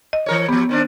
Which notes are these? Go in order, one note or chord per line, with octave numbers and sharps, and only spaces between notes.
D#5
E3 A#4 C#5
F3 B3 G4
D#3 C4 D4